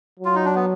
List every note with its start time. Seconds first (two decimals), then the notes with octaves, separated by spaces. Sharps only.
0.19 F#3
0.25 F4
0.35 D#4
0.45 D4
0.55 B3